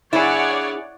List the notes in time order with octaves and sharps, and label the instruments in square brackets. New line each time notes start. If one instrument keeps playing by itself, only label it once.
[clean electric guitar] D4 G#4 [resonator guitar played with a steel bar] E4 [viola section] C#5 D5 F#5